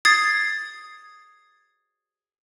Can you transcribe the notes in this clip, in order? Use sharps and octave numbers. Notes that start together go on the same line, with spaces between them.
D#6 G#6 A6 C7